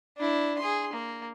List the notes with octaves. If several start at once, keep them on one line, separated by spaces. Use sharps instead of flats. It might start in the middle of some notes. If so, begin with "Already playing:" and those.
D4 E4
G#4 C6
A#3